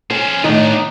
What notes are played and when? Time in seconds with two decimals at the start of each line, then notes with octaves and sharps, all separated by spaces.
0.10 C#4 C5 G#5
0.44 A2 D#3 B3 D4 D#4